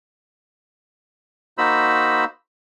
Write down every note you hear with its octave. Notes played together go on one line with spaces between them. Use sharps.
A#3 D#4 F#4 C5 B5 E6